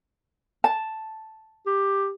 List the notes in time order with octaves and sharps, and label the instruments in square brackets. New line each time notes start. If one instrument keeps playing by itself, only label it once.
[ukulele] A5
[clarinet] G4